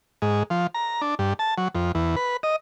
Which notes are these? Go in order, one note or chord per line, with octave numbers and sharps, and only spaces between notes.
G#2
F3
A#5
D4
G2
A5
F#3
F2
E2
B4
D#5